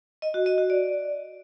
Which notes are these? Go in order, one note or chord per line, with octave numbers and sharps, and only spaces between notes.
D#5
F#4
D#5
F#4
D5